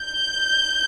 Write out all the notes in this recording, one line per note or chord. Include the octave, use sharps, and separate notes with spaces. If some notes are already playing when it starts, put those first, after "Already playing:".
Already playing: G6